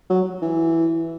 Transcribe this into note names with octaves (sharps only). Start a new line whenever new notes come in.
F#3
E3